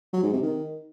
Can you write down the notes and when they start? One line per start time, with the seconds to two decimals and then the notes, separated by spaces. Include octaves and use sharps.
0.13 F#3
0.23 G#2
0.33 C3
0.43 D#3